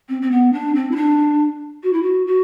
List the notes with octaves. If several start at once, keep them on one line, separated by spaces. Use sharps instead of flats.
C4
C4
B3
D4
C4
E4
D4
F#4
E4
F#4
F#4